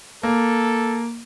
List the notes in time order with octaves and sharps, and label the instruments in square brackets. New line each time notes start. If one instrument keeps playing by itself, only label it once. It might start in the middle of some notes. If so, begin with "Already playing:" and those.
[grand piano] A#3 [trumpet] A4